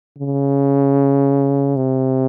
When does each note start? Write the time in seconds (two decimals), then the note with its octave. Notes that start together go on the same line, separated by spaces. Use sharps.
0.18 C#3
1.76 C3